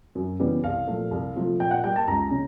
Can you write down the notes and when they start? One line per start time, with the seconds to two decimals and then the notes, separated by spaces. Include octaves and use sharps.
0.15 F#2
0.40 C#3 E3 G3 B3
0.64 C2 F5
0.87 A#2 F3 A3
1.11 C2
1.36 C3 F3 A3
1.60 A#2 G5
1.71 F#5
1.84 G3 A#3 G5
1.96 A5
2.08 C#2 A#5
2.31 C#3